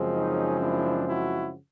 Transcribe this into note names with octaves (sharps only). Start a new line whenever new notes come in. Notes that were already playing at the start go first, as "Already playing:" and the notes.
Already playing: F#2 C#3 F3 G#3 C4
C#4 D#4
D4 E4
E4 F#4